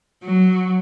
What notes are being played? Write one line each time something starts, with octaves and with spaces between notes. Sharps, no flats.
F#3